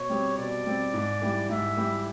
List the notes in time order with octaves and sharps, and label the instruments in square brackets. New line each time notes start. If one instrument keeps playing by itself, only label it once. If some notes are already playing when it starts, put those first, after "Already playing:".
Already playing: [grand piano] B2 [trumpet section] C#5
[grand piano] G3 C4
[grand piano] B2 [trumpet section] D5
[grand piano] G3 C4
G#2
E3 G3
[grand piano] G#2 [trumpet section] E5
[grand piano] E3 G3